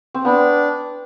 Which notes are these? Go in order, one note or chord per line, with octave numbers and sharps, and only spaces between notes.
C4
B3 D4